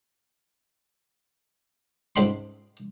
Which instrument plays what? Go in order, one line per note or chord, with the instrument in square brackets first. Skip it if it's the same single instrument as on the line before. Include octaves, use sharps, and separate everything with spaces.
[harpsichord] C#2 G#2 C4 B5 C6